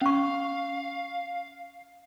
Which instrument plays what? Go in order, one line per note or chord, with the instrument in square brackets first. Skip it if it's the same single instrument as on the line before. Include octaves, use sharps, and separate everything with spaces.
[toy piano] C#4 C#6 [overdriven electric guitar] F5